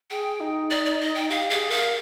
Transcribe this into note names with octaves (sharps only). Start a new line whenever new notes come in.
G#4 G5
D#4
D5
D5
D#5
G5
G4 F5
G#4 F5
A#4 F5